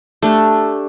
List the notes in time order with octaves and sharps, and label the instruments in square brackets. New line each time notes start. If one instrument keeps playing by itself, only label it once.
[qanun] A3 D4 G4